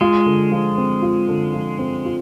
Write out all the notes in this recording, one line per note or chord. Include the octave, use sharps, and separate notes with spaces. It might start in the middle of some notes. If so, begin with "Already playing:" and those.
G#3 F4
D3
F3
C4
F4
D3
F3
C4
F4